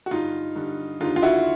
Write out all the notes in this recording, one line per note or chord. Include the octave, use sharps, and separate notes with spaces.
F#4
G2 D3 D#4 F4
G2 D3
D#2 D3 D#4 F4
F4
E4 F#4